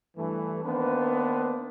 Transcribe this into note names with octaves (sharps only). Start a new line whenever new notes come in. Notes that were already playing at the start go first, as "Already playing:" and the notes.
G2 E3 A3
D#3 A#3 B3 D4 B4 C5